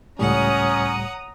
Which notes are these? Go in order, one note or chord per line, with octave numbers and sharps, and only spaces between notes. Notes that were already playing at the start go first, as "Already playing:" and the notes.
C#2 A2 G3 C#4 C#5 F#5 A#5 D#6